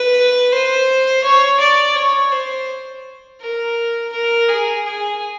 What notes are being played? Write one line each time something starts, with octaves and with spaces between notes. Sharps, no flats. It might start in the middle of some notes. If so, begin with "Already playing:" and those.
Already playing: B4
C5
C#5
D5
C#5
C5
A#4
A#4
G#4
G#4